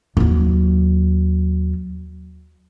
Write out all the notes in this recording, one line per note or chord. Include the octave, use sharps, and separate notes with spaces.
D#2 F#3